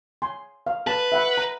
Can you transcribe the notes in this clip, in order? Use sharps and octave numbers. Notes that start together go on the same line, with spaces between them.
G#5 C6
F5
B4 A5
E5 F#5 B5
A#5